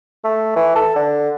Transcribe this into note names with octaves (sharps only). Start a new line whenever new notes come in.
A3
E3
A4
D3